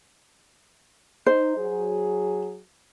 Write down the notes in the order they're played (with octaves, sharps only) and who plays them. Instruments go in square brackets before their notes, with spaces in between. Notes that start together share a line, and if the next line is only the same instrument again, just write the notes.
[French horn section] D#4 [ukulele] C5
[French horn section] F#3 G#4